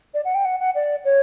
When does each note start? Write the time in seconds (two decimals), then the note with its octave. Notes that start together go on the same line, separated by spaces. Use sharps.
0.14 D5
0.25 F#5
0.34 G5
0.45 F#5
0.60 F#5
0.75 D5
1.05 C#5